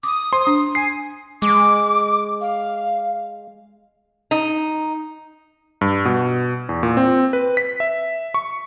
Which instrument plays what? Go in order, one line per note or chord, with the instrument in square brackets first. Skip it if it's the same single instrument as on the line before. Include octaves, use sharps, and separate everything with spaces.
[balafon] D6 [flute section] D#6
[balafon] C5 [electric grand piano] C6
[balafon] D4
[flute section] G#5 [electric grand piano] C7
[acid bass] G#3 [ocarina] D6
[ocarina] F5
[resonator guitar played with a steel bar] D#4
[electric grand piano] G2
B2
E2
A#2
C4
B4
B6
E5
C#6